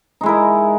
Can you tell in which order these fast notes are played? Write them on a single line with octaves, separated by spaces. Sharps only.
D#4 G#3 E4 A#4